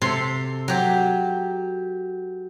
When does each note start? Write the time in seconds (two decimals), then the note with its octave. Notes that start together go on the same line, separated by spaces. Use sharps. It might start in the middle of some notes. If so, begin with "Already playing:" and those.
0.01 C3 A4 C6
0.68 F#3 G4